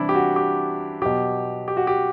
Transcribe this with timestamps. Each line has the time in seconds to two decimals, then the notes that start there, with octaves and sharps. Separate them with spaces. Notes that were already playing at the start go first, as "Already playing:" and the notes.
Already playing: C3 E3 G3 D4 E4
0.09 G4
0.15 F#4
0.36 G4
1.02 B2 F#3 G4
1.68 G4
1.77 F#4
1.87 G4